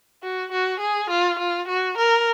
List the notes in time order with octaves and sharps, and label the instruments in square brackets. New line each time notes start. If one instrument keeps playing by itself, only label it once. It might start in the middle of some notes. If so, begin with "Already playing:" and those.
[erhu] F#4
F#4
G#4
F4
F4
F#4
A#4